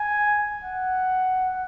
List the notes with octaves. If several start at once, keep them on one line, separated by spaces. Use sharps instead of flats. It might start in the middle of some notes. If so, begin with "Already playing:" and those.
Already playing: G#5
F#5